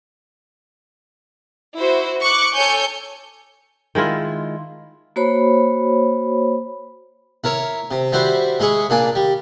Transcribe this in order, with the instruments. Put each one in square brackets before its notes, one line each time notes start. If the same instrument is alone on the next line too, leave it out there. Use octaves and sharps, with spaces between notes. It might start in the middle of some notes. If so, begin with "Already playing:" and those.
[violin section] E4 F#4 C5
C#6 D6 F#6
A4 C#5 G#5 G6 C#7
[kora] D#3 G#3 E4 F4
[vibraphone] A#3 F#4 C5 C#5 B5
[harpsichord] E4 A#4 C#5
C3
G3 E4 F#4 C5
G#3 E4 G#4 C#6
A#2 D4 G#5
G3